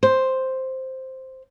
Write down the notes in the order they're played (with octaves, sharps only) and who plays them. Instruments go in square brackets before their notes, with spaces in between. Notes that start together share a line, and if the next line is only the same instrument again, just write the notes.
[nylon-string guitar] C5